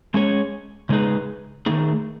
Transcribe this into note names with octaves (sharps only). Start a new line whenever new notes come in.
G#3 C#4 G#4 C#5
C#3 G#3 D#4 G#4 B4
D#3 A3 D#4 G#4